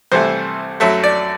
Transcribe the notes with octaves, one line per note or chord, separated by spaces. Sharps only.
C2 C3 E3 A3 C5
F#2 F#3 A3 E5
D5